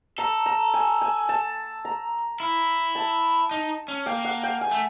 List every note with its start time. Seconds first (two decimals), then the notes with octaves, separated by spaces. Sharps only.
0.18 A4 A#5
0.46 A#5
0.74 G#5
1.01 G#5
1.29 A5
1.85 A#5
2.40 E4
2.95 A5
3.51 D#4
3.88 C#4
4.06 A#3 G5
4.25 F#5
4.43 G5
4.61 G#5
4.71 A3